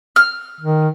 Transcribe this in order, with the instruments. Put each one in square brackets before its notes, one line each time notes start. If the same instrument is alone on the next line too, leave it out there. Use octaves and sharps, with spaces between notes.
[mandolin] F6
[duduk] D#3